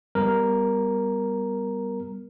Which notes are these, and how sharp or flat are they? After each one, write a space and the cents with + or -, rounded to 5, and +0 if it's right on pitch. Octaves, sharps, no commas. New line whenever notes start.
G3 +0 B3 +0 A#4 +0